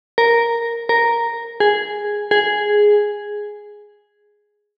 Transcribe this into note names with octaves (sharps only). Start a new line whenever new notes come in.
A#4
A#4
G#4
G#4